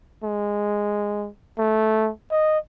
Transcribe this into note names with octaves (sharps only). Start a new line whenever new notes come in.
G#3
A3
D#5